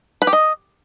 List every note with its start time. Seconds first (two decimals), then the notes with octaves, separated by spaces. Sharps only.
0.22 B4
0.27 G4
0.33 D#5